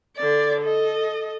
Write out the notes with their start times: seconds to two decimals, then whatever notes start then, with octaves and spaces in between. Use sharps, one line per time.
0.16 D3 D5
0.61 A4 D#5